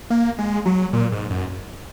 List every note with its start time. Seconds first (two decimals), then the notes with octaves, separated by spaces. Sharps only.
0.10 A#3
0.39 G#3
0.66 F#3
0.93 A#2
1.12 G#2
1.30 F#2